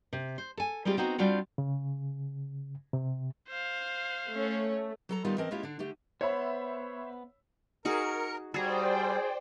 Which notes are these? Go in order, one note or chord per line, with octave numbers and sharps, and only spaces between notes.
C3
C5
A4 G#5
G3 G#3 C4 F4 G4
B3 C4 D#4 F4 F#4
G3 C4 D4 F4 F#4
C#3
C3
C5 F5
A3 C#4 C#5
F#3 A4 A#5
D#3 G3 B3 D#4 F4 A#4
E3 C4 C#4 A#4 D#5 A5
G#3 A#3 C#4 E4 F4 G4
D3 D4
D3 A3 G4
B3 C5 C#5 E5 B5
D#4 F#4 G#4 A#4 C#7
G3 F#4 G#4 C5 D5 G5 A#5